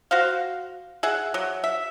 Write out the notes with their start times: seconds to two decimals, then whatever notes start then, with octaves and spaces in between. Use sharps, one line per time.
0.11 F#4 C5 F5
1.03 G#4 E5 F#5
1.34 F#3
1.64 E5